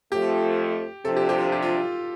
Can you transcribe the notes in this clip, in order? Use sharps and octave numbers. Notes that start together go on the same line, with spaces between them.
F2 F3 A3 G4
C3 F3 D4 A4
G4
G4
F4
G4
F4